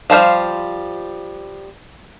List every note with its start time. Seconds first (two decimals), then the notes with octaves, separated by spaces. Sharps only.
0.10 F3 G3 C5 F5